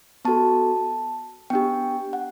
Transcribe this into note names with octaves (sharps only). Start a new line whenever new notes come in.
B3 F#4 A4 A5
B3 D4 G4 G5
F#5